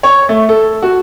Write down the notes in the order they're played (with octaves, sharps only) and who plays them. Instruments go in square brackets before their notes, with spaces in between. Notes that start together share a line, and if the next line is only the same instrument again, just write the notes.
[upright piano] C#5
A3
A4
F#4